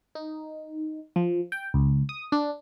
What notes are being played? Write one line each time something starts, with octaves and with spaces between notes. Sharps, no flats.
D#4
F3
G5
C#2
D#6
D4